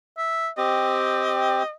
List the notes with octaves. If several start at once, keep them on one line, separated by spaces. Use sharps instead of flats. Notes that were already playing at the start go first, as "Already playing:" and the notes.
E5
C4 G4 D#5